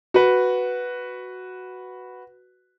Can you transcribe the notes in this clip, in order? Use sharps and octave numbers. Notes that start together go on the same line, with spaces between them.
F#4 B4